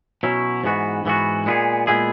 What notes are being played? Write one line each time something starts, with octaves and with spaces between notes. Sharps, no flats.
B2 F#3 C#4 E4
G#2 E3 B3 F#4
G#2 E3 B3 F#4
A#2 G#3 B3 E4 G#4
A#2 G#3 B3 E4 G#4